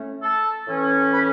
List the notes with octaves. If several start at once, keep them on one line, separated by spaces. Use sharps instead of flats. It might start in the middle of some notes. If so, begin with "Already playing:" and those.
Already playing: A2 A3 C#4
A4 A5
A2 E3 C#4
B4 B5